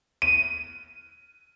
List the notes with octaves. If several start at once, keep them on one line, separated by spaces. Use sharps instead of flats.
D#7